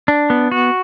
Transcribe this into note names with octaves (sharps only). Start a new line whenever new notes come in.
D4
B3
F#4